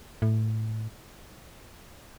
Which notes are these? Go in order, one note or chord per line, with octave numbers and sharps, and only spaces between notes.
A2